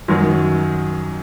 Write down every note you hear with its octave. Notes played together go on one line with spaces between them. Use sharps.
F#2 D#3 F#3